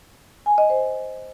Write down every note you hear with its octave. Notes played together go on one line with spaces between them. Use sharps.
G#5
D#5
C5